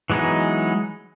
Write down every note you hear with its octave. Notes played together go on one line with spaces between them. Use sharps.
E3 F#3 G#3 B3 D#4